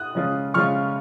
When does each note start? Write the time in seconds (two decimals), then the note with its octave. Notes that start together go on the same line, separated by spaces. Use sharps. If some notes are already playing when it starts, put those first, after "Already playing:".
Already playing: D#6 F#6
0.15 C#3 F3 G#3 C#4 F4
0.54 C#3 F3 G#3 C#4 F4 C#6 F6